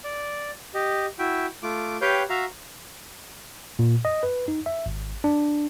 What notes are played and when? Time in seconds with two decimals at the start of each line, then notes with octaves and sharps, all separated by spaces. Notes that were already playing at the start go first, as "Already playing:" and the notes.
0.04 D5
0.74 G4 D#5
1.19 E4 F#4 E5 G5
1.63 A3 F4 D6
2.01 G4 B4 C#5 F5 G5 G6
2.30 F#4 E5 F5 A#5
3.79 A#2
4.05 D#5
4.23 B4
4.48 D#4
4.66 E5
4.86 G#1
5.24 D4